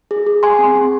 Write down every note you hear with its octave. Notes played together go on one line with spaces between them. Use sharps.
G#4
G#4
G#4 G#5 C6
C4
C4